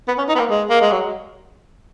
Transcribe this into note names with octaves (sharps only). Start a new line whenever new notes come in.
B3
C#4
D#4
B3
A#3
G#3
A#3
G#3
F#3